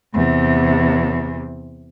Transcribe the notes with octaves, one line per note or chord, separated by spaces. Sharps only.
E2 C3